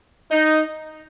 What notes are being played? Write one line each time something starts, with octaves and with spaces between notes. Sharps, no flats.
D#4